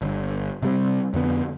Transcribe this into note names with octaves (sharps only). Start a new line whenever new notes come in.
G1
C3 G3 C4
F2 D3 B3